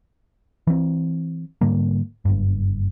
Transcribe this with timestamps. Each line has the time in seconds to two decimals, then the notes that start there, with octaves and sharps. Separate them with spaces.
0.67 E3 C4
1.61 G#2 D3 G3 A#3
2.25 F#1 G2